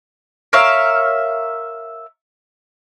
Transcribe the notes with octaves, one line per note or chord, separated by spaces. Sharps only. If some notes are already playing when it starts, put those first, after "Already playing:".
A#4 C#5 E5 F5